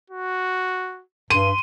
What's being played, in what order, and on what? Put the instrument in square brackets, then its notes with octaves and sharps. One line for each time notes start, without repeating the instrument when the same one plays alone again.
[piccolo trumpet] F#4
[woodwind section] G2 [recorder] C6 [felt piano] D#7